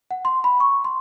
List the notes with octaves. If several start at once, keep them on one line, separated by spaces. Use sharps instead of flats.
F#5
C6
B5
C#6
C6